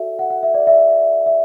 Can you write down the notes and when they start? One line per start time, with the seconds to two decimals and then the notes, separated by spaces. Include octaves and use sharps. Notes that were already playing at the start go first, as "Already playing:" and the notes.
Already playing: F#4 A4 D5 E5
0.19 F#5
0.30 F#5
0.43 E5
0.54 D5
0.67 E5
1.26 E5